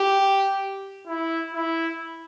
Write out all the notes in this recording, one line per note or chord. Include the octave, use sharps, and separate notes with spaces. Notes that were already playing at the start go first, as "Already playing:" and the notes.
Already playing: G4
E4
E4